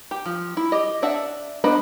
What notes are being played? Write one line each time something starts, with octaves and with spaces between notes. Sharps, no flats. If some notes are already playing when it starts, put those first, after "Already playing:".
G4
F3
E4
G4 D#5
D4 E5 F#5 A5
B3 D4 C5 D#5 B5